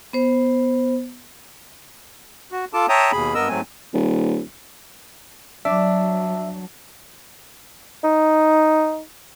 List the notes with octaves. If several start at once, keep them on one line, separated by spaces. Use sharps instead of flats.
B3 C5
F#4
F4 A4 A5 D6
C#5 E5 G5 A5 A#5 D#6
D#2 B2 G#4 B5
G2 B3 A#4 D#5 E6
G#2 F#3 A3 C4 G#5
D#1
F#3 D4 E5
D#4